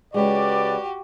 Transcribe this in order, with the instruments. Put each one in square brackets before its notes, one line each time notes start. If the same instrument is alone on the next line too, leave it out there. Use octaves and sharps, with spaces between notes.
[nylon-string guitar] C#3 G#3 [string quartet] F#4 G4 [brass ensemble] B4 D5